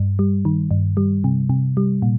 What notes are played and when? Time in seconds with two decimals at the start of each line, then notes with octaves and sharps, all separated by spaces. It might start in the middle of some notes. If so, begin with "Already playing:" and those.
Already playing: G2
0.19 G3
0.45 D#3
0.71 G2
0.97 G3
1.24 C3
1.49 C3
1.77 G3
2.02 A#2